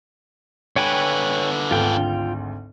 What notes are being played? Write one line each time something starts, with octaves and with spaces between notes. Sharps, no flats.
D3 B4 C#5 G5 G#5
G#1 D2 F4 G5